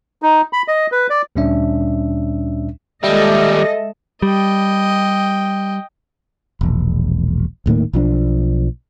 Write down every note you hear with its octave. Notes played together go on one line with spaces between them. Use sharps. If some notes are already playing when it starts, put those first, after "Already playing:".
D#4
B5
D#5
B4
D5
D2 A#2 G3 C#4 D4 E5
D#2 G3 G#3 A4 D#5 E5
G3 D#5 G5
E1 A#1
D#1 A2 D#3 A#3
B1 F3 D4